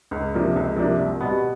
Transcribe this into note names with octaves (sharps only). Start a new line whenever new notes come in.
C#2
C3 F3 A#3 D4
C#2
C3 F3 A#3 D4
C2
B2 G3 B3